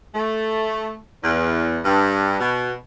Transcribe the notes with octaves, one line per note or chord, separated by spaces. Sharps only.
A3
E2
G2
B2